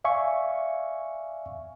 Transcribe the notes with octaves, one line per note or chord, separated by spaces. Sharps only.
D5 E5 F5 G#5 C#6